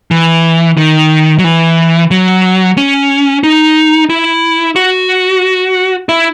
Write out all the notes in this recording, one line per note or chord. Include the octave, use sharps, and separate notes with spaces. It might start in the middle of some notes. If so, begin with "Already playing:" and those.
E3
D#3
F#3
E3
F#3
C#4
D#4
E4
F#4
E4